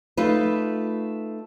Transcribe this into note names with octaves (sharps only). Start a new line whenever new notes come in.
A3 D#4 F4 B4